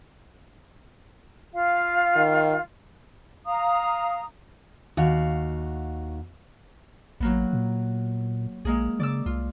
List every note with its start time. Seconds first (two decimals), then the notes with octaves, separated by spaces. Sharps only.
1.53 F4 F5
2.16 D#3
3.45 F5 A#5 D#6
4.97 D#2 F#4 F5
7.20 A1 F#3 A#3 B3
7.53 A#2
8.65 A#1 G#3 A#3 G#4
9.00 C#3 D5 D6 E6
9.26 C2 F4